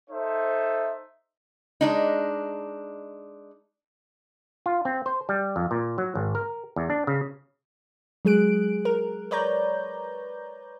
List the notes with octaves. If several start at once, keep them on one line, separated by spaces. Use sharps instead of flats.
D#4 A4 C5 E5
G#3 D4 D#4
F4
C4
C5
G3
F2
A#2
F#3
G#1
A#4
E2
D4
C#3
F#3 G#3 G#4 F#6 D7
A#4
B4 C#5 D5 A#5 G6